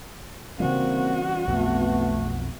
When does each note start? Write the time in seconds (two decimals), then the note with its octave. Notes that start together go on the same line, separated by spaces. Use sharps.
0.60 C#3 E3 G3 A#3 C4 F#4
1.47 B1 F2 A3 B3 C4